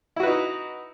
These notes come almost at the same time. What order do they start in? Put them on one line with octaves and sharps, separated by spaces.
E4 F#4 B4 D#4